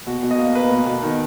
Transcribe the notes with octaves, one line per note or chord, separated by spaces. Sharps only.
B2 F#4
B2
D#5
A#3
A#3 B4
B2
B2
D#3